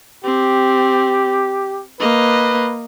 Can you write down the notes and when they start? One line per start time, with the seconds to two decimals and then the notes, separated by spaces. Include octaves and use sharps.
0.25 C4 G4
2.00 A#3 B4 D#5